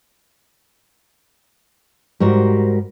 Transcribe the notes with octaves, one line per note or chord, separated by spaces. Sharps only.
G#2 G3 F#4 G4 A#4 C5